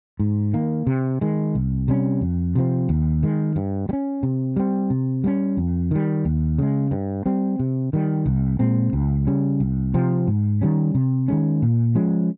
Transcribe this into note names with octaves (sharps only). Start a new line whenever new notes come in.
G#2
D#3 A#3
C3
D#3 G#3
C2
C3 G3 C#4
F2
C3 F3 C4
D#2
D#3 G#3
G2
G3
C#4
C3
G3 C4
C3
G3 A#3 C#4
F2
D#3 G3
D#2
C#3 G#3
G2
G3 C4
C3
D#3 G3
C2
A#2 G#3 C4
C#2
C#3 G3 C#4
C2
C3 F3 C4
G#2
D#3 G3 C#4
C3
D#3 G#3 C#4
A#2
F3 G#3 C#4